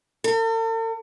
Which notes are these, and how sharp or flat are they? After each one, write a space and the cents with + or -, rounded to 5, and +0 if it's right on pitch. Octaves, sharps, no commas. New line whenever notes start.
A4 +45